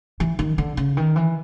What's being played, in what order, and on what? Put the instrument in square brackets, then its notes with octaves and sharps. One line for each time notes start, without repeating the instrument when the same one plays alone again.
[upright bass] E3
D#3
D3
C#3
D#3
E3